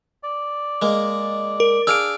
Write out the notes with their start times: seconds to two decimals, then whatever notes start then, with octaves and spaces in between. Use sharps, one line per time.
0.23 D5
0.82 G#3 A#3
1.60 A#4
1.87 D4 G#4 F5 E6 F6 D7